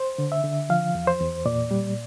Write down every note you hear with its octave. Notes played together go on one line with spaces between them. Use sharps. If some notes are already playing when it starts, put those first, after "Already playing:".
Already playing: C5
D3
E5
D3
F3 F5
E2
C5
E2
A#2 D5
G3